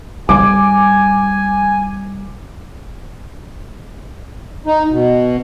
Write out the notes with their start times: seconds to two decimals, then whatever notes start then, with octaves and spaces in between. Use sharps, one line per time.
0.29 G#2 G3 G#5 D6
4.66 D#4
4.91 B2